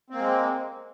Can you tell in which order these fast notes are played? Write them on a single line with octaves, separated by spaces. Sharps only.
C4 A#3 G#3